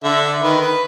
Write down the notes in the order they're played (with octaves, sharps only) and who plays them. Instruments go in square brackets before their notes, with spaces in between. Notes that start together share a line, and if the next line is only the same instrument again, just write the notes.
[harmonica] D3 E5
D#3 B4
B4